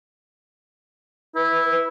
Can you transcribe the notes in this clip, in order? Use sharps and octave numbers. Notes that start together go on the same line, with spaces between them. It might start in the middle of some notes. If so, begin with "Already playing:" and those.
E4 B4